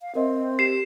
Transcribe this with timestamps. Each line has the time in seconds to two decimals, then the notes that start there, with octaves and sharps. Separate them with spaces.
0.01 F5
0.15 C4 A#4 D#5 E5
0.59 G4 C7 E7